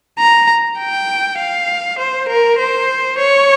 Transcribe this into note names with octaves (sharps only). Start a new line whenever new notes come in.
A#5
G5
F5
C5
A#4
C5
C#5